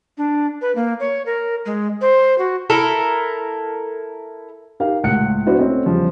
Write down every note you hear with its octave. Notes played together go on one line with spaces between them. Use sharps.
D4
B4
A#3
C#5
A#4
G#3
C5
F#4
E4 A4 A#4
D#4 G4 A#4 F5
C#2 A2 F#5 F#6 C#7
B3 D4 E4 F#4 C5 D5
A3 C4 C#4 D#5
E2 C#3 F3 G3